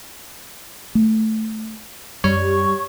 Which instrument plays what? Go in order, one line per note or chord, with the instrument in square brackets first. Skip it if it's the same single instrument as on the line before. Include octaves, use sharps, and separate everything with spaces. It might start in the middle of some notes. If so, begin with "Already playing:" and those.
[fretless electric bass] A3
[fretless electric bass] F#2 [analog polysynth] G3 [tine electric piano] C#5 [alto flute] C#6